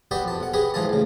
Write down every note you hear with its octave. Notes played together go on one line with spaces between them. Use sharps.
F#4 G4 B4 D5 D#5 G5
F2 A5
B2 F#5
G4 G#4 B4 D#5
G#2 E3 F3 G#4 D#5 A5
A1 C#3